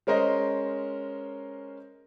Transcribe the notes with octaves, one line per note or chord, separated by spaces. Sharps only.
G#3 C#4 A#4 C5 D#5